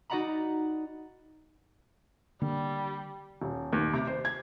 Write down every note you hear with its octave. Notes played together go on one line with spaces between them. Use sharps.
D#4 F#4 D5 F#5 A#5 B5
D3 G3 A#3
D#1
D#2
C3
C5
G#6